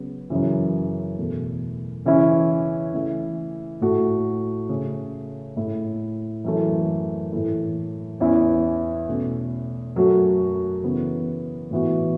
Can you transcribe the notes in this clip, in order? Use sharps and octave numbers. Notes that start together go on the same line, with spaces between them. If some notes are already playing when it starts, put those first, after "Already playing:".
Already playing: C#3 F#3 B3
F#2 C#3 E3
E2 B2 A3
C#3 E3 C#4 E4
C#3 E3 A3 E4
A2 A3 F#4
C#3 A3 C#4
A2 A3 E4
F#2 E3 A3
A2 E3 A3 E4
E2 E3 C#4 E4
B2 A3 C#4
F#2 F#3 A3 F#4
C#3 E3 B3
A2 E3 B3 F#4